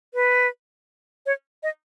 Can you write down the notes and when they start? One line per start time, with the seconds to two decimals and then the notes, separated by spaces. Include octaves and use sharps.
0.14 B4
1.26 C#5
1.63 D#5